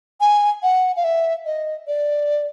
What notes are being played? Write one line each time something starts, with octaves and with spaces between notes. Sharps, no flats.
G#5
F#5
F5
E5
D#5
D5